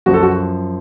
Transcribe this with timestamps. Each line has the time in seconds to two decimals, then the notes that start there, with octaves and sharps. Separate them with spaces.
0.06 F#2 F3 F#4
0.14 A4
0.23 F#4